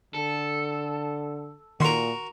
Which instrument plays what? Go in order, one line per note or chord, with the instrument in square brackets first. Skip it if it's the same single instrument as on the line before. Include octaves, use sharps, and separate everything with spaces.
[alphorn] D3 [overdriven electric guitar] A4
[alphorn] A#2 [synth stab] D#3 C6 [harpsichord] F#4 A#4